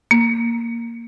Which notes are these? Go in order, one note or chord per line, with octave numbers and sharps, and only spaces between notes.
A#3